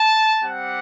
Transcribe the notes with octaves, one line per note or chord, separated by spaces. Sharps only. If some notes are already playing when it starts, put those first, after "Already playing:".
Already playing: A5
G3 C4 G4 F#5